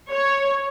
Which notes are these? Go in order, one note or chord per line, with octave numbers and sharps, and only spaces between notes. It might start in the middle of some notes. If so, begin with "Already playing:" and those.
C#5